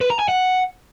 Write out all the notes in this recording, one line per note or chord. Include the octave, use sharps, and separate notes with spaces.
B4
A#5
G#5
F#5